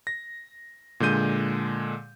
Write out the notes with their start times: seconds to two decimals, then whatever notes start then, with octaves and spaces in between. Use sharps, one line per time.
0.07 A#6
1.00 A#2 D3 G#3 G6 D#7